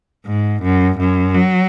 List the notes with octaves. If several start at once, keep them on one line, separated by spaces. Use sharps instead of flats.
G#2
F#2
F#2
F#3